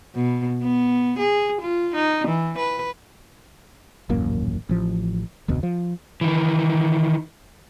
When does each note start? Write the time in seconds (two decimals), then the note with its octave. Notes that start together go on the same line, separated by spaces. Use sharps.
0.15 B2
0.62 B3
1.19 G#4
1.61 F4
1.95 D#4
2.28 E3
2.58 B4
4.09 D#1 A1 F#2 A#3
4.69 A1 F3
5.48 F1 D2 B2
5.63 F3
6.21 D#3 E3